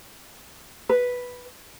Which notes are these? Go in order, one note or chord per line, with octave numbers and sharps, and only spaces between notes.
B4